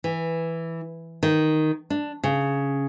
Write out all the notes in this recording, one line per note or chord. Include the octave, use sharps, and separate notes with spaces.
E3
D#3
D4
C#3